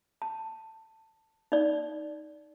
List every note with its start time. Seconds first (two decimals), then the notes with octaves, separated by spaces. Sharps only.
0.22 A5
1.52 D#4 D5